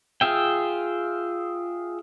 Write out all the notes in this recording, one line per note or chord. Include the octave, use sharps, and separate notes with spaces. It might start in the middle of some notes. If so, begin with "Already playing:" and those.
F4 G#4 E5 G5